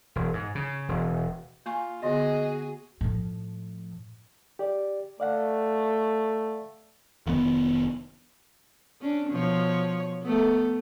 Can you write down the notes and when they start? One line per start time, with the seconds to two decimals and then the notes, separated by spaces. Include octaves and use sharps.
0.16 E1
0.33 G#2
0.55 C#3
0.89 E1
1.66 A#3 F4 G#5 C#6
2.02 D3 B3 F#4 G#4 D#5
3.01 A2 F3
4.59 G4 D5
5.20 A3 D5 F5 F#5
7.27 F1 D#3 B3
9.01 C#4 D4
9.30 B2 F3 C#5
10.22 A3 B3